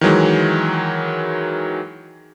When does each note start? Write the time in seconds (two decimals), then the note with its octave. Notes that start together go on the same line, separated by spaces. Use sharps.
0.01 D#3 E3 F#3 G#3